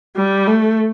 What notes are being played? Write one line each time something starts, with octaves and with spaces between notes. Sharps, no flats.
G3
A3